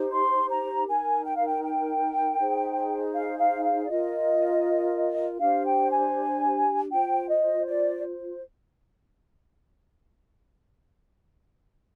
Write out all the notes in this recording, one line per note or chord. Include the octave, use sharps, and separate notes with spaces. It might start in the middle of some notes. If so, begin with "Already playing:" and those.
Already playing: D#4 G4 C5
C6
A#5
D#4 A#4 G#5
G5
F5
G5
G5
D#4 G#4 C5
F5
F5
F5
D5
F4 A#4 D#5
D4 G4 C5 F5
G5
G#5
F4 C5 G5
D#5
D5